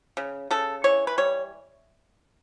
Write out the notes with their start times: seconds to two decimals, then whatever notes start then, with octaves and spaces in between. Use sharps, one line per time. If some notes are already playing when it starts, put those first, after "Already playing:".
0.17 C#3
0.51 C#3 A4
0.84 E3 C#5
1.07 B4
1.18 G3 C#5